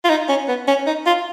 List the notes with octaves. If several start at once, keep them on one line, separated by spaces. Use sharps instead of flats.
F4
D#4
C#4
B3
C#4
D#4
F4